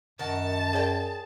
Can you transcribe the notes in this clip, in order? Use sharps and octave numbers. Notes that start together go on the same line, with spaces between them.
F#2 D#3 F#4 A5
G#4 A#4 C#5 D5 G5